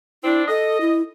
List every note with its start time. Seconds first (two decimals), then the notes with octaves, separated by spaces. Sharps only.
0.24 C4 D4 E4
0.48 A4 D#5
0.81 E4